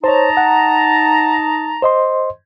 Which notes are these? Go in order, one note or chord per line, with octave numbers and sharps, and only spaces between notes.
D#4 C5 C#5 A5 A#5
F#5
C5 D#5 C6